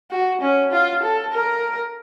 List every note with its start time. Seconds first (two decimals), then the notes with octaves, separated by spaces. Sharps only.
0.11 F#4
0.41 C#4
0.72 F4
1.03 A4
1.33 A#4